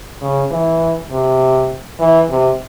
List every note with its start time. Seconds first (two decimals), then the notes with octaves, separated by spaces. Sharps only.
0.21 C#3
0.51 E3
1.10 C3
1.99 E3
2.29 C3